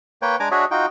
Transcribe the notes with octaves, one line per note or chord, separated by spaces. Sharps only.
A#3 B4 C#5 G5
G#3 D4 G#5 A#5 D6
D4 F#4 G#4 C#5 D#5 E5
D#4 F4 F#4 G5